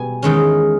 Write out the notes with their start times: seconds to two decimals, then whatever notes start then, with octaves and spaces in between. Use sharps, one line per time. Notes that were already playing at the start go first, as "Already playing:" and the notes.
Already playing: B2 G3 G#5
0.23 E2 D#3 G#3 C#4